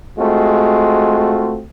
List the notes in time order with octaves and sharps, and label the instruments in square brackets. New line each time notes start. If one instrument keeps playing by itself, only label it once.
[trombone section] G#3 A3 C4 F4 F#4